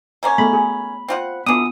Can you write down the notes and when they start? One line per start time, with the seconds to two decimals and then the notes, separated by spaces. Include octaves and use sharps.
0.23 C#3 A#3 C#4
0.38 A3 B3 G#4 B5
0.53 G#4
1.08 C4 F4 F#5
1.47 D3 E3 B3 F4 D#6